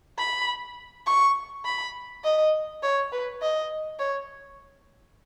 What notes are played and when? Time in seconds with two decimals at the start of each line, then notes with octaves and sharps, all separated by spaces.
0.19 B5
1.07 C#6
1.65 B5
2.24 D#5
2.83 C#5
3.12 B4
3.42 D#5
4.00 C#5